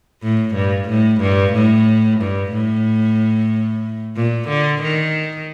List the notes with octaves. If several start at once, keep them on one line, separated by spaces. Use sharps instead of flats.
A2
G2
A2
G2
A2
G2
A2
A#2
D3
D#3